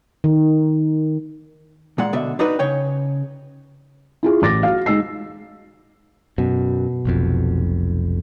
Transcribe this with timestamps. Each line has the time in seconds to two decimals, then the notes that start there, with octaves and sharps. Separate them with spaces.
0.24 D#3
1.98 A#2 G#3 F#5
2.13 B2 D3 E5
2.39 D4 D#4 F#4 B4
2.59 C#3 C#5 G5
4.23 E4 F4 G#4
4.42 A1 D6 A6 A#6
4.63 F#4 F5
4.86 G#3 D#4 E6 C7
6.38 F#2 B2
7.05 F1 B1 F2